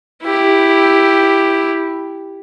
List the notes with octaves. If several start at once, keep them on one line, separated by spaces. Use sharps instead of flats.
E4 G4